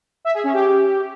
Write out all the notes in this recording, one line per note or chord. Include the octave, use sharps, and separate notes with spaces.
E5
G#4
C#4
G4